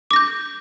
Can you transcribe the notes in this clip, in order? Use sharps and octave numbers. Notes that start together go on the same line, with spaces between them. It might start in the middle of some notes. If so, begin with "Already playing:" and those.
D6 G6 A#6